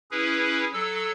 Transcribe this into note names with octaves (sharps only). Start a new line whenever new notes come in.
C#4 E4 G#4 B4
F#3 A4 E6